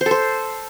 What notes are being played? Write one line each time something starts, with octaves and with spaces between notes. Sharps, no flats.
C5
A4
C5